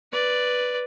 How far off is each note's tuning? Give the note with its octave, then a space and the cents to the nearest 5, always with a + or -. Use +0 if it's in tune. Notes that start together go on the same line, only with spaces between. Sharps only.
B4 +0 D5 +0